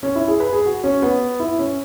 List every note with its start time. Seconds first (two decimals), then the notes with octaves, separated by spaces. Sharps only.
0.03 C#4
0.15 E4
0.28 G#4
0.40 B4
0.53 G#4
0.65 F#4
0.84 C#4
1.02 B3
1.40 E4
1.59 C#4